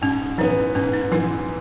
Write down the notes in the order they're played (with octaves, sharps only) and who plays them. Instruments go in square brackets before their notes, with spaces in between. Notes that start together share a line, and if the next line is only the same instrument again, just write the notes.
[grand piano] G#2 [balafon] C#4
[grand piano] E3 B3 [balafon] D#4
[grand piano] G#2 [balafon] C#4
[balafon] D#4
[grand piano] E3 B3 [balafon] E4